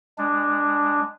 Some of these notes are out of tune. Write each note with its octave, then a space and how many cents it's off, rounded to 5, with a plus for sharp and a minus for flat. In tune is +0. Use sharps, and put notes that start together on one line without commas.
G#3 -20 D4 +0